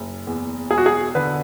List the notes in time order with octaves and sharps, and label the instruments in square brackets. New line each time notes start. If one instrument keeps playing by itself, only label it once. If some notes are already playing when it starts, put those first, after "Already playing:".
Already playing: [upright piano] F#1
E2
[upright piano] E1 [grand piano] G#4
[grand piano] F#4
G#4
[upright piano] D3 [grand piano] B4